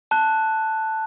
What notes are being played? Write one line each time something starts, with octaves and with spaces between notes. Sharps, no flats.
A5 F#6